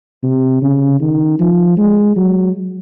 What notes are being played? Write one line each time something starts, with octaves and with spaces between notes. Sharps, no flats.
C3
C#3
D#3
F3
G#3
F#3